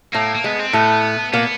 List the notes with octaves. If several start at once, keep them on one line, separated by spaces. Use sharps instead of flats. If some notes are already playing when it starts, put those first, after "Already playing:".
A2 A3 A#3
A#3
G#3 B3
C4
A2 A3 B3
A#2 A#3 B3